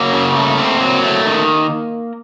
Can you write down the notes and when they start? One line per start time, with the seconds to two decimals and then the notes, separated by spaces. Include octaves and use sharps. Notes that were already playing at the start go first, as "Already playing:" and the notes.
Already playing: F#3 A#3 A#4
0.13 C#3
0.36 A3
0.58 C4
0.81 F#3
1.03 A3
1.26 D#3